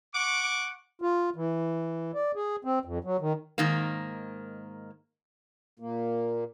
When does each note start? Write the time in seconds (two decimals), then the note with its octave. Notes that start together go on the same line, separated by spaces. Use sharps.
0.14 F#5 C#6 D6
1.02 F4
1.36 E3
2.15 D5
2.35 G#4
2.65 C4
2.85 F2
3.04 F#3
3.20 D#3
3.58 G#2 D#3 A#3
5.79 A#2 A#3